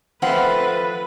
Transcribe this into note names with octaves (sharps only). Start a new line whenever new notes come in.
F3 A3 C4 B4 F#5